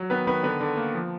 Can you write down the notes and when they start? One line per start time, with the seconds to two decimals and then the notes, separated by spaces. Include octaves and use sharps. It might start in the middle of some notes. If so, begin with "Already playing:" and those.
Already playing: F#3
0.10 D#3 B3 B4
0.27 D#3 B3 B4
0.43 D3 B3 B4
0.61 D3
0.77 A#3
0.95 F3